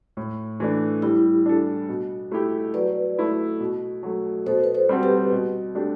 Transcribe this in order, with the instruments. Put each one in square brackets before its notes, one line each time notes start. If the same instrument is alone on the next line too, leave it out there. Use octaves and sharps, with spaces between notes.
[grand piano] A2
E3 A3 D4
[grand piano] G3 [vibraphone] E4 G4
[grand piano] D4 A4
B2
A3 E4 G4
[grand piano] F#3 [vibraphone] B4 D5
[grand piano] A3 E4 A4
B2
F#3 A3
[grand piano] B2 [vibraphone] A4 C5
[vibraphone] B4
A4 C5
[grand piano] G3 C4 F#4 A4
[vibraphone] G4 B4
[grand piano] B2
A3 D4 G4